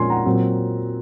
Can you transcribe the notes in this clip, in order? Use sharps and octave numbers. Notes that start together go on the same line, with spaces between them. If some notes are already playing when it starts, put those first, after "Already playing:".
Already playing: A#2 F3 G#3 C#4 G#5 C6
F#5 A#5
A#2 F#3 C4